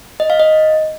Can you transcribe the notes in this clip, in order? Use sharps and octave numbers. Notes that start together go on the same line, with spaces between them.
D#5
F5
D#5